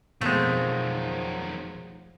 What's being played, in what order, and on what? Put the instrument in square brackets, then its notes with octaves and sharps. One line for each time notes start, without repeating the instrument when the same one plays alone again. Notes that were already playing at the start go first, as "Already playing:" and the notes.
[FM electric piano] F2 B2 [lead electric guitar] D#3 F#3 [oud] F3 [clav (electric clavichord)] G#3 A3